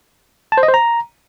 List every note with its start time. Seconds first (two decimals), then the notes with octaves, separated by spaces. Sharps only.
0.52 A5
0.58 C5
0.63 D#5
0.68 C5
0.74 A#5